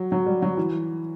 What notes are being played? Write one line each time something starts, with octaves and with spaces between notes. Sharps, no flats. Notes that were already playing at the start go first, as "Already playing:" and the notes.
Already playing: F#3
F#3
G3
F#3
E3